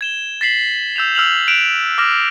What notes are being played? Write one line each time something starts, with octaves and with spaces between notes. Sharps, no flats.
G#6 E7 G7
A6 B6 C7 F#7
E6 G6 E7 F7
E6 F6 F7 F#7
F#6 D7 E7 F7
D6 F6 A#6 E7